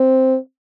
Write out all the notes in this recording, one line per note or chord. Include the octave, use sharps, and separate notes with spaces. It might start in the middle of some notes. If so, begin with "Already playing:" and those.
Already playing: C4